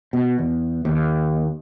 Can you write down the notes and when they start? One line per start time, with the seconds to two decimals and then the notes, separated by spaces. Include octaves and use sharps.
0.13 B2
0.38 E2
0.85 D#2